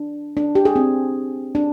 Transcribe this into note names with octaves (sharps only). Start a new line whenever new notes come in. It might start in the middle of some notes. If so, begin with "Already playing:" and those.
Already playing: D4
D4
G4
G#4
C4
D4